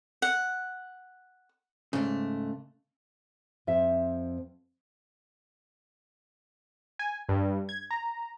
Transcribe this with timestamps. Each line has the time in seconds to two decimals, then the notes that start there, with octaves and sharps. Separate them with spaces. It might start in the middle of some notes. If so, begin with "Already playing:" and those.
0.22 F#5
1.93 G#2 C#3 A3
3.67 F2 C4 E5
6.99 G#5
7.29 G2
7.69 G#6
7.91 A#5